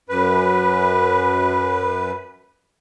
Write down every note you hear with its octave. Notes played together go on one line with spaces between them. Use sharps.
F#2 B4